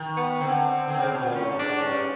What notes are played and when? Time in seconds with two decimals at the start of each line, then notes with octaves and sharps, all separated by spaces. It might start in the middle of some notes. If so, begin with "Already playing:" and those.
Already playing: D#3
0.17 B3
0.40 D3 C4
0.88 D3
0.99 C#3
1.11 B2
1.23 A#2
1.35 A2 C#4
1.52 G2
1.59 G#2 D4
1.82 G2 C#4